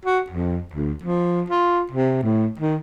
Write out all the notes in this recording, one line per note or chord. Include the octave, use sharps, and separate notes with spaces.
F#4
F2
D2
F3
F4
C3
A2
D#3